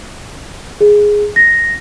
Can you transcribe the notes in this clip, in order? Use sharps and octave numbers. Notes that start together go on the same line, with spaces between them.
G#4
A#6